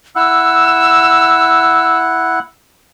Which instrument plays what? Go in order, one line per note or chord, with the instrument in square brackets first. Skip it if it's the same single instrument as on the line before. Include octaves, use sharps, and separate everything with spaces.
[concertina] E4 F#5 [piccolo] E6